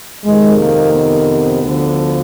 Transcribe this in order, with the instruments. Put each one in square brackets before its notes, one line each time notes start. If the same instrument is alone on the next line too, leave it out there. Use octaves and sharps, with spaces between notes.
[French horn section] F2 C3 D#3 G#3
A#3
B3
D2 D3 F3